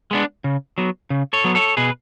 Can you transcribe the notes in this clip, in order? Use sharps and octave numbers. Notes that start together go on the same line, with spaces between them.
G#3 B3 D4
C#3
F#3 B3
C#3
A4 C#5
F#3 B3
A4 C#5
B2 G#4 B4